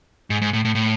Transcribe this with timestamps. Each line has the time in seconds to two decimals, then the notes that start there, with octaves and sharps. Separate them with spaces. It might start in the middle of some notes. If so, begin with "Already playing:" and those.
0.30 G#2
0.42 G#2
0.53 A2
0.65 A2
0.75 A2